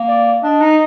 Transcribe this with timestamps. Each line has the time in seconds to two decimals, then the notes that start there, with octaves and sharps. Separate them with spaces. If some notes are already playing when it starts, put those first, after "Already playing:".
Already playing: A#3
0.08 D5
0.43 D4 D#5
0.61 D#4